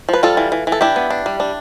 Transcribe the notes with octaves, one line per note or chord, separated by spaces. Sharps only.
F3 B4
G3 F4 A4
E3
E3
E3
A4
D4 E4 G4
B3
D4
G3
D4